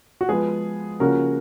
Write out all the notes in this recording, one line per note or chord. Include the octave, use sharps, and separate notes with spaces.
F#4
F3 G#3 B3 G#4
C#3 F3 A#3 C#4 F#4 A#4